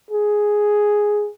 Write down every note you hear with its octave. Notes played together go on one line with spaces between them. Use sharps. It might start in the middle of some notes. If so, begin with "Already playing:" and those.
G#4